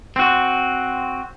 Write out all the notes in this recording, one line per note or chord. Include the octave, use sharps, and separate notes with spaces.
C4 F#4